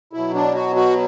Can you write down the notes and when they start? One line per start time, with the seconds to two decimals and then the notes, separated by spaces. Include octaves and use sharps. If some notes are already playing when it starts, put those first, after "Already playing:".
0.13 B2 F#3 E4
0.34 D4
0.54 F#4
0.76 F#4